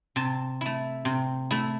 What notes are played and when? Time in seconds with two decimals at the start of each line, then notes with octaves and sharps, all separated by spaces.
0.16 C3 A5
0.61 A3 E4
1.05 C3
1.51 A3 E4